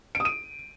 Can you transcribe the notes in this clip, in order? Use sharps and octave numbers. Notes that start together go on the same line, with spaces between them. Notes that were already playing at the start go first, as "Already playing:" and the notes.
D7
D#6
D#7